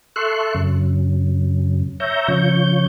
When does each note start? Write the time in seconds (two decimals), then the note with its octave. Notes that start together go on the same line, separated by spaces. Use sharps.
0.16 A4 E5 C6 C#6 F#6
0.55 F#2 C#3
2.00 C#5 E5 A#5 G6
2.28 C#3 F3 C#5 G6